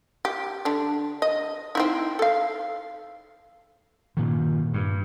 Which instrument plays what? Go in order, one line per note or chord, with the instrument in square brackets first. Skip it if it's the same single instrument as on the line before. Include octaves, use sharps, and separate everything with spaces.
[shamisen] G4
D3 D4
D#5
C4 D#4 E4
A4 F5
[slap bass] G2 A#2 D#3
G2